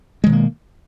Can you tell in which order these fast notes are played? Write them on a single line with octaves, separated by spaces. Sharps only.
G#3 D#3 B2 A#3